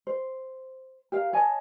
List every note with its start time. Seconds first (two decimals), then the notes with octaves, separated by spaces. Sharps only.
0.07 C5
1.12 G4 A#4 F5
1.33 C#5 D#5 G#5 A5